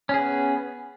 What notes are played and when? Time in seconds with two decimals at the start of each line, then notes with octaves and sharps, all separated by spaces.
0.09 C#4
0.14 G#4
0.19 B3